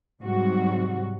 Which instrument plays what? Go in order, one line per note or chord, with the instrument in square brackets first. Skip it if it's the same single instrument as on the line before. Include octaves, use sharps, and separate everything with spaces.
[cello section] G#2 C3 F#3 G3 F#4